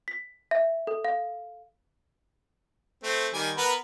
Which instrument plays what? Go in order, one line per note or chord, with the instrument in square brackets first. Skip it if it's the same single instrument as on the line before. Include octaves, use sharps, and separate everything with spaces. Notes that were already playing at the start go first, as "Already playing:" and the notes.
[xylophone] B6
E5
A4
F5
[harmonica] A3 C4
D#3 G3 G#5
B3 A#4 B4